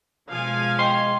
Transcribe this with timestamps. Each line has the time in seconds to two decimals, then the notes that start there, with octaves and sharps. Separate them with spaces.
0.29 B2 F3 G#3 F5 G#5
0.79 D#5 G5 C6